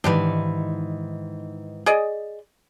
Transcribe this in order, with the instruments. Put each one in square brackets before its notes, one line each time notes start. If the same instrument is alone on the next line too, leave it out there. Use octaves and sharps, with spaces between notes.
[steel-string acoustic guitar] G#2 D#3 E3 [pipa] D4 G4 B4
[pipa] G#4 D5 D#5